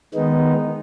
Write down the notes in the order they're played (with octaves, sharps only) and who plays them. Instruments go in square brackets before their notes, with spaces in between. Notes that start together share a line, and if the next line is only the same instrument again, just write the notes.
[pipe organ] D#3 G#3 B3 D#4